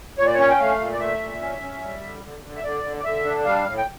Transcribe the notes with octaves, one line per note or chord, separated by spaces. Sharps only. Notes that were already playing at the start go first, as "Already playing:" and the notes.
A#2 C#5
D5
C#4 C#5
G5
A3 F5
A#2
D5
A3 E5
A#2
C#4
C#4
G3
D3
D3
D3
E5
D3 D5
D3
D5
D3 E5
D4
G3 F5
A2
G5